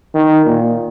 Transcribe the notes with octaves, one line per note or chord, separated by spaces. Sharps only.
D#3
A#2